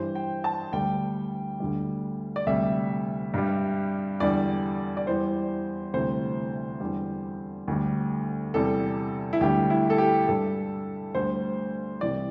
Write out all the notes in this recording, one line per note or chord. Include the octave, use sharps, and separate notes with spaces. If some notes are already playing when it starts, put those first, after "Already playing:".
Already playing: G2 E3 G3 C5
G5
A5
D2 D3 G3 G5
D2 D3 G3
D5
D2 C3 G3 E5
G2 G3
E2 D3 G3 D5
D5
E2 E3 G3 C5
D2 C3 E3 G3 C5
E2 D3 G3
D2 D3 G3
E2 C3 G3 A4
E4
D2 D3 G3 G4
E4
A4
G4
G2 G3 A4
D2 D3 G3 C5
C2 C3 E3 G3 D5